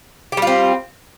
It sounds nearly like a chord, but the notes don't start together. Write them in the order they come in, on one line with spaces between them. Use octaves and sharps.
G4 G3 F4 C4